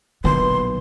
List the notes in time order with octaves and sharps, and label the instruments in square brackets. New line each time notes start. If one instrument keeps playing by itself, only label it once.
[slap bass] B1 A#2 [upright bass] D3 [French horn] B4 [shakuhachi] C6